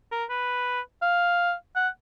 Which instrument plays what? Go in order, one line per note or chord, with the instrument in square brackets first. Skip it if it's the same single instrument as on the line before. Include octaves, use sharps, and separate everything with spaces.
[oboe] A#4
B4
F5
F#5